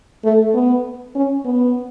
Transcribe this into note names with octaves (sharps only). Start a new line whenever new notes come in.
A3
B3
C#4
B3